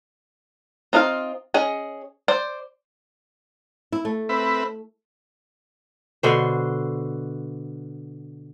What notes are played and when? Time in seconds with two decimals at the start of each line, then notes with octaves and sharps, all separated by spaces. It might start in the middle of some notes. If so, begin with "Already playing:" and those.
0.93 C4 D#4 F4 A#4 F5
1.54 C#4 G#4 D#5 G#5
2.28 C5 D5
3.92 E4
4.05 A3
4.29 C4 B4 E5
6.23 B2 D3 C5